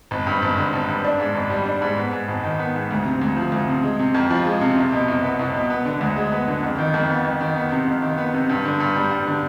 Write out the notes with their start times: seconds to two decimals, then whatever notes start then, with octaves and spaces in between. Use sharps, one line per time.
0.11 G#1
0.27 G2
0.42 G#1
0.58 D3
0.73 G#1
0.88 G2
1.05 D4
1.20 G#2
1.35 G#1
1.50 G3
1.66 D4
1.82 G#2
1.97 B3
2.13 G#2
2.28 G#1
2.44 D#3
2.59 B3
2.75 G#2
2.91 D2
3.05 C3
3.22 D2
3.36 F3
3.52 D2
3.68 C3
3.83 G#3
3.99 C3
4.14 F2
4.30 F3
4.45 G#3
4.61 C3
4.77 C2
4.92 B2
5.08 C2
5.23 B3
5.39 C2
5.54 B2
5.70 B3
5.85 D3
6.01 D2
6.16 G#3
6.32 B3
6.48 D3
6.63 F2
6.79 D#3
6.94 F2
7.09 B3
7.24 F2
7.41 D#3
7.56 B3
7.72 C3
7.87 F2
8.02 D#3
8.18 B3
8.34 C3
8.49 G2
8.65 D3
8.80 G2
8.96 G3
9.11 G2
9.27 D3